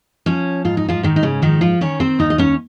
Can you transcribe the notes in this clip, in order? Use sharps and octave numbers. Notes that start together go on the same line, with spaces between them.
F3 C#4 C#5
G#2 F4
D#4
F3 F4
G#2 D#3 D#4
D#4
C#3 C#4
D#3 F3 D#4
F3 F4
D#3 C#4 C#5
C4 C5
D#2 D#4 D#5
D#5
C#4 C#5